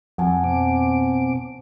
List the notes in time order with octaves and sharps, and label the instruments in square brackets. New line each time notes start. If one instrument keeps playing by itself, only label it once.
[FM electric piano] F2 [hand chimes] F#5 G#5 A5
[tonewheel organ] B2 C4 D6